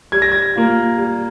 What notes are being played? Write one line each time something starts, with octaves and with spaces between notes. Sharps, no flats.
G3 G#6
A#6
G#6
A#3 F4
G3